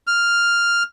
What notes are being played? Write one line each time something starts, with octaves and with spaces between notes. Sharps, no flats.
F6